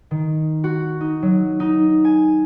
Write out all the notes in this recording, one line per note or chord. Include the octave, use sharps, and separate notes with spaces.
D#3
F#4
D#4
F#3
D#4
G#5